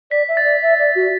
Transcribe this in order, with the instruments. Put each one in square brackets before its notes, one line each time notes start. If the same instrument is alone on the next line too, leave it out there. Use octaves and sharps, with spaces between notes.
[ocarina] D5 [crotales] B6
[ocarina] E5
[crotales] A6
[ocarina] D5
E5
D5
F#4